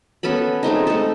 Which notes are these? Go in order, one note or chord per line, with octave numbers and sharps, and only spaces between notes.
B3 C#4 A4 B5
G#3 A3 C4 D#4
D#4 A4